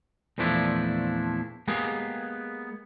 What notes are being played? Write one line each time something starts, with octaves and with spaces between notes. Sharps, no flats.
E2 A#2 F3 A3 D4 E4
G#3 A#3 B3 G4 G#4